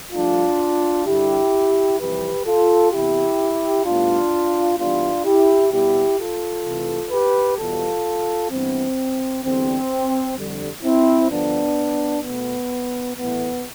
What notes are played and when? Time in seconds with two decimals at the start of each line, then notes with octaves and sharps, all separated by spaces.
0.12 G2 F3 A3 D4 F4
1.05 G2 D3 G3 E4 G4
1.99 F2 C3 E3 G3 G4 B4
2.46 F4 A4
2.92 C3 E3 B3 E4 G4
3.85 A2 G3 B3 D4 F4
4.78 G2 E3 G3 B3 D4 F4
5.24 E4 G4
5.71 B2 G3 B3 E4 G4
6.18 F4 A4
6.65 C3 E3 A3
7.10 G4 B4
7.58 E2 B2 G3 B3 F4 A4
8.51 G2 E3 B3 C4
9.43 E2 D3 G3 C4
10.37 F2 D3 G3
10.83 C4 E4
11.30 G2 D3 F3 B3 D4
12.23 B2 A3 B3
13.16 A2 E3 A3 B3